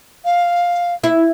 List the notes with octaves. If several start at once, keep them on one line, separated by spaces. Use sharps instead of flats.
F5
E4